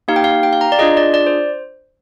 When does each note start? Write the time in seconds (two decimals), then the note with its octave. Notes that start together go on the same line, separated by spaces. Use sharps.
0.08 A#3 D#4 G4 F5
0.16 G5
0.24 F5
0.43 G5
0.53 F5
0.61 A#5
0.72 D5
0.79 D4 F4 G#4 D#5
0.97 D5
1.14 D5
1.27 C5